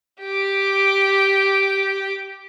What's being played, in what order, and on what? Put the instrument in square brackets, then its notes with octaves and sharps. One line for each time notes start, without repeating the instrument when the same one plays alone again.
[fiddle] G4 D6